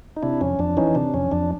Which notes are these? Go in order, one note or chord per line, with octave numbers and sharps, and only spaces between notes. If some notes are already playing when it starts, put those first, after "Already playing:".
D#4
C3 D4 E4
F2 C#4
F2 D4
E3 C#4 D#4
C3 D4
F2 C#4
F2 D4